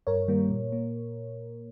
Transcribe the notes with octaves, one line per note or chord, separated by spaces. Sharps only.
G2 A#4 C#5
D#3 G3 A#3
A#2
A#3